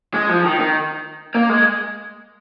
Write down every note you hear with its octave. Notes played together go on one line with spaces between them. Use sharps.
G#3
F3
D#3
D#3
A#3
G#3